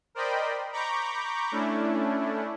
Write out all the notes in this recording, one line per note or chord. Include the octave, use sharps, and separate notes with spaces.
A#4 C5 D5 D#5 G5 B5
A#5 B5 C#6 D6 G6
A3 C#4 D4 E4